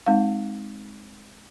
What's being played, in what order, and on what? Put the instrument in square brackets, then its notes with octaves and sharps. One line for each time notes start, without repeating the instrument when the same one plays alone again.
[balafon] G#3 C4 D#4 F5